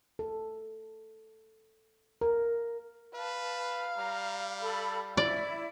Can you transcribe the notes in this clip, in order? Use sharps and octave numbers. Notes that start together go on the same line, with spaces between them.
A4
A#4
B4 F5 A5
G3 A#5
A4 B5
E4 D5